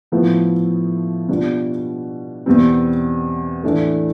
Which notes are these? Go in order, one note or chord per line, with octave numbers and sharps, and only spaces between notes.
A2 F3 B3 E4
B2 G3 D4 F4
E2 B2 G3 C4
A2 E3 A3 D4